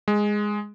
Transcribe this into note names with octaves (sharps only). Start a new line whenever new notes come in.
G#3